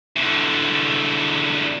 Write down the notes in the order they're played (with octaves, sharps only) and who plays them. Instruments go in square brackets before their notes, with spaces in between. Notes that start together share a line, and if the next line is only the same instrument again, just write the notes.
[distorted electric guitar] E2 D3